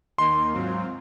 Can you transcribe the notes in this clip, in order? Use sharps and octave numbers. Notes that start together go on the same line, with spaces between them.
D#2 D#3 A#3 D#4 C6
G#2 F#3 C4 F4